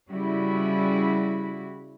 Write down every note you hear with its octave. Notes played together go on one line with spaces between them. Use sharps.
C#3 G3 E4 F#4